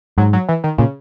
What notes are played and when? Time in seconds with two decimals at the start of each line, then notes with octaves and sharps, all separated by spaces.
0.18 G#2 F#3
0.33 F#3
0.49 E3
0.64 D#3
0.78 A#2 C#3